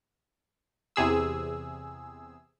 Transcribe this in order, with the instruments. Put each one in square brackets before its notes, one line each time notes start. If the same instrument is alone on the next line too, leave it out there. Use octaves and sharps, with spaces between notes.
[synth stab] E2 C3 G#4 E6